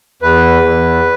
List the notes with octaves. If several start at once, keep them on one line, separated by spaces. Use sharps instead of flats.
E2 B4
E2